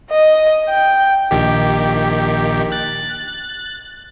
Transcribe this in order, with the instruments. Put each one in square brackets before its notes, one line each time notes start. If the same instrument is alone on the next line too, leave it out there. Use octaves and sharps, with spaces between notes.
[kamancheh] D#5
G5
[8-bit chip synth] A#1 D#3 G4
F#6 A6